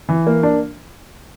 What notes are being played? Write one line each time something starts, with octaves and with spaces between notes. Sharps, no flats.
E3
A#3
D4